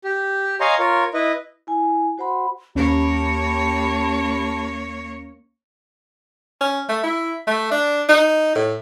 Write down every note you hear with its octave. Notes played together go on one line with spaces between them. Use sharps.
G4
C#5 D#5 F5 G#5 A#5 C6
F4 A#4 C#5
E4 B4 D#5
E4 G#5
F#4 C5 F#5 B5 C6
D#2 A#3 C#4 G4 C#5 A5 B5
C#4
A3
E4
A3
D4
D#4
A2